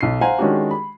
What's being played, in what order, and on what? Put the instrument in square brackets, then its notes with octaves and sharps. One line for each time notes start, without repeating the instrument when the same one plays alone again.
[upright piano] B1 C7
C5 F5 F#5 G#5 A#5
D#3 G#3 C#4 D4 F#4 G4
B5